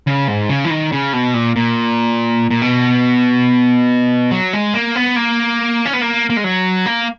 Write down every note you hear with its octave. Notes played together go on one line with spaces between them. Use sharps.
C#3
G#2
C#3
E3
D#3
C#3
B2
A#2
A#2
A#2
B2
F#3
G#3
A#3
B3
A#3
C#4
B3
A#3
A#3
G#3
F#3
A#3